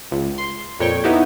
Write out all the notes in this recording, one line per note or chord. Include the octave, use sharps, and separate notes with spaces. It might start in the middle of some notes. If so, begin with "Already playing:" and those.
C#2
C6
F2 A#2 C#5 G5 C#6
B3 D#4 E4 G4